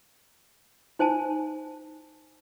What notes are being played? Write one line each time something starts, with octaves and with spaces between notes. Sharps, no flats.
D#4 C5 G#5 A5